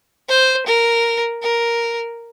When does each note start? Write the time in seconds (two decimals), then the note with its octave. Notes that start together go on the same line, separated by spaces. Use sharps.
0.29 C5
0.66 A#4
1.43 A#4